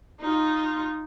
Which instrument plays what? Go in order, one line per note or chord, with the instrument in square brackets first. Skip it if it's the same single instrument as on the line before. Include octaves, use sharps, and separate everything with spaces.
[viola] D#4 F4